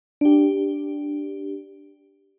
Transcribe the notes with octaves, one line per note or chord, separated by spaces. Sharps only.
D4 G4